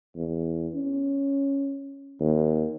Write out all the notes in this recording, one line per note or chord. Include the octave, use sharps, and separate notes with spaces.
E2
C#4
D#2